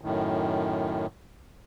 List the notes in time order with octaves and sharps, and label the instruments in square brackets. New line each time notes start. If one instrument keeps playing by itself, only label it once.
[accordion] F#2 A2 D#3